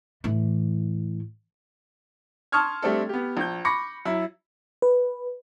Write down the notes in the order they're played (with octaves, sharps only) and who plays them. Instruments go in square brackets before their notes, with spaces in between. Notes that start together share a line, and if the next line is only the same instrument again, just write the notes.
[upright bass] A2 E3
[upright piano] A5 C6 C#6 D#6 F6 G#6
G3 A3 C4 D4 A4
B3 G4
A#1 G6
B5 C#6 D6 A#6 C#7
F#2 E4
[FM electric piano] B4